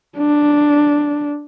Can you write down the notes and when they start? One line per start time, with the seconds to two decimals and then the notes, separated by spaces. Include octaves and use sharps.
0.18 D4